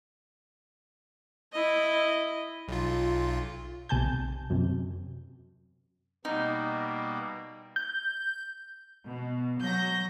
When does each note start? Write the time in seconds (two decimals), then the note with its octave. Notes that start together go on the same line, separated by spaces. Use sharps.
1.52 E4 D#5
2.68 B1 F4
3.89 B1 C3 G#5 A5 G6
4.50 F#2 C3
6.25 B2 G3 A#3 D#4
7.76 G6
9.06 B2
9.60 F#3 G6 A#6